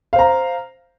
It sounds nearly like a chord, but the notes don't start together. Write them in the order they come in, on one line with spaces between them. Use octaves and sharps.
F5 C5 A#5